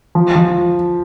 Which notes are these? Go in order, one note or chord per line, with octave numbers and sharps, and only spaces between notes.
F3
F3